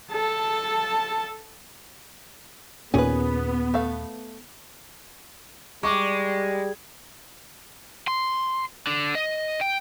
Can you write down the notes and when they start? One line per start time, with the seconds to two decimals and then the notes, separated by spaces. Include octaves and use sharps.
0.11 A4 A5
2.94 D#2 A#2 B3 C#4 G#4 B4
3.74 A3 F5
5.83 G3 G#3 C#6 D6
8.08 C6
8.87 D3
9.15 D#5
9.61 G5